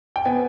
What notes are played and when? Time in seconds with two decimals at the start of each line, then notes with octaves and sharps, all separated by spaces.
0.16 G5
0.25 B3 G#5